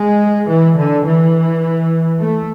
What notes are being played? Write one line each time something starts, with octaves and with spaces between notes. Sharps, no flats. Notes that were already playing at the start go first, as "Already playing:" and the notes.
Already playing: G#3
E3
D3
E3
A3